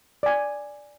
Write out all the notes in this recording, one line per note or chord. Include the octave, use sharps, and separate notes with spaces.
D5 G#5